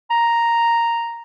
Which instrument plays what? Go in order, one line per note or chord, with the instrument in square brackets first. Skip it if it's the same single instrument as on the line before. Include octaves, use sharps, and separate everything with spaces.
[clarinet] A#5